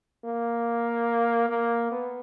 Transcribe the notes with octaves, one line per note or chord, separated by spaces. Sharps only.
A#3
A#3
B3